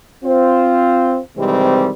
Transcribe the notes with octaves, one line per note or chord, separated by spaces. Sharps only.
C4 F4 C5
C3 D#3 E3 G3 G#3 C4